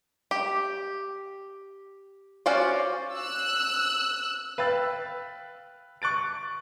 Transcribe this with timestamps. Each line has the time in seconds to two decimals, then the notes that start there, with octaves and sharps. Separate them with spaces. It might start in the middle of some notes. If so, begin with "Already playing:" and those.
0.31 G4
2.46 C#4 F4 F#4 C5 D5
3.15 E6 F#6
4.58 B4 F5 G5 E6 A6
6.02 C#6 F#6 A6 D7